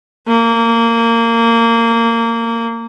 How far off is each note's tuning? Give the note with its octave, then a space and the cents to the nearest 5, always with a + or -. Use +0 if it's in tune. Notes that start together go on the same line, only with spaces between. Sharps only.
A#3 -20